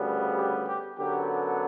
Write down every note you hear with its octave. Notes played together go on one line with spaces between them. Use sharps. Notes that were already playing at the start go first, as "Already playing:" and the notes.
Already playing: D2 C#3 G3 B3
G4
G4
F#2 D3 F#3 B3 G4